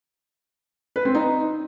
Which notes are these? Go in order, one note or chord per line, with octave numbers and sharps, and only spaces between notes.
B4
C4
D#4